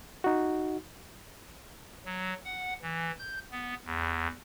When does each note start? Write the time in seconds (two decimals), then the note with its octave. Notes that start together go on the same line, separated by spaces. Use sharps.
0.24 D#4 F#4
2.05 F#3
2.45 F#5
2.82 E3
3.19 G6
3.52 B3
3.85 E2